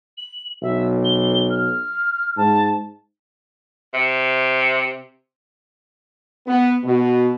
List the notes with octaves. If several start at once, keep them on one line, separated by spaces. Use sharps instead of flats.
F#7
B1 E5
G7
F6
G#2 A5
C3
B3
B2